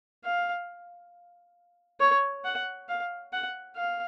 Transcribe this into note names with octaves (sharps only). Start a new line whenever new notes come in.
F5
C#5
F#5
F5
F#5
F5